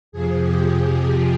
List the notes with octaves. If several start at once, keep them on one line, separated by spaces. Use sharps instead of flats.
F2 C3 F3 G#4
G4